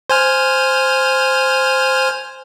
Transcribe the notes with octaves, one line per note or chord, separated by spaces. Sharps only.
C5 G#5 F6